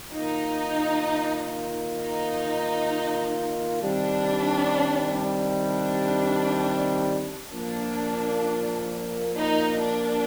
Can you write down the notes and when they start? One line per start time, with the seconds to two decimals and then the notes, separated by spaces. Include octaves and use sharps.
0.12 D#3 A#3 D#4 F4
1.97 D#4
3.82 C3 D#3 G3 D4
5.67 D4
7.51 A#2 F3 A#3 D4
9.36 D#4
9.82 D4